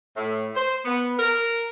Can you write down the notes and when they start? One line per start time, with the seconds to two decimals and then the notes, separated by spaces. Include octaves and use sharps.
0.17 A2
0.55 C5
0.85 B3
1.19 A#4